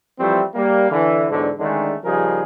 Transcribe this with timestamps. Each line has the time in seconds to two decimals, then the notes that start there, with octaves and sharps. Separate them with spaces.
0.19 E3 F3 G3 A3 C4
0.55 G3 A#3
0.91 D3 E3
1.30 E2 G#2 D3 F#3 D4
1.59 D3 D#3 G#3 A3 C#4 D4
2.04 C#3 F3 G3 D#4 G#4 A#4